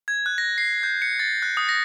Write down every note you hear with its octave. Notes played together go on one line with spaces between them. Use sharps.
G#6
F#6
A#6
C7
G6
C#7
A6
F#6
D#6
A#6